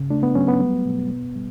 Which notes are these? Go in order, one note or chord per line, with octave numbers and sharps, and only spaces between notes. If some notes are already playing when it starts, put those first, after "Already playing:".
Already playing: C#3
A3 D4
B3
F#3 C#4
B3
G3
B2
B3
G3